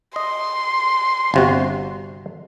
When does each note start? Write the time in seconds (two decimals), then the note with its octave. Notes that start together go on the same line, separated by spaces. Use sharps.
0.16 D#5 C6
1.34 G1 C3 F#4